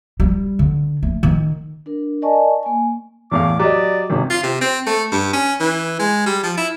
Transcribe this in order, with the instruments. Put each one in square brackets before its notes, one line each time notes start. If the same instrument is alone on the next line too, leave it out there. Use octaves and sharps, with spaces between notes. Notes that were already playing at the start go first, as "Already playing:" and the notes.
[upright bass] G3
D3
A3
D#3
[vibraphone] D4 A#4
A#4 D5 D#5 G#5 A5 C#6
A#3 G#5
[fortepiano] E2 A2 F5 [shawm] D6
[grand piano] F#3 D#5 [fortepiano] G4 [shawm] D5
[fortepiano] G#1 [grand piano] C3
[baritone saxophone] F4
C3
C4
A3
G2
C#4
E3
G#3
G3
F3
E4